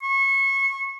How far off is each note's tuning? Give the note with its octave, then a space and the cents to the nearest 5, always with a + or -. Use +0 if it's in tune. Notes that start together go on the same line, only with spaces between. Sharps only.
C#6 -25